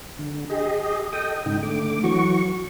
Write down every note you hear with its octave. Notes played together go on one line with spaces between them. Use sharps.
D3
G4 G#4 D#5
A4 D#5 G5 D#6
G#2 C#3 D#4 G5
D3 A3 D6
E3 F#3 F#4 C#6